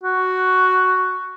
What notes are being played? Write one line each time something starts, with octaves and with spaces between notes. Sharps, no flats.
F#4